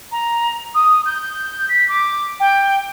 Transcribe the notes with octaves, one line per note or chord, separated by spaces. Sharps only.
A#5
D#6
G6
B6
D6
G5